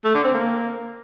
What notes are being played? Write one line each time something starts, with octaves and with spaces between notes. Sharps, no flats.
A3
D3
C4
A#3